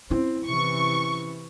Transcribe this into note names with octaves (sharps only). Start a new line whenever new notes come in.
C4 C#4 E4
C3 E3 C#6